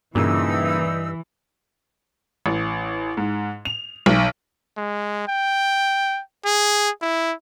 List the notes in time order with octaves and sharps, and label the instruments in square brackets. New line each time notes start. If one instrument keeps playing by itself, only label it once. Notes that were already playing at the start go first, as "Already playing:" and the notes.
[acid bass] G2 [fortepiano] A#2 C#3 [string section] E3 [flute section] D#4 E6
[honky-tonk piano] A1
G#2
F7
B1
[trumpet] G#3
G5
G#4
E4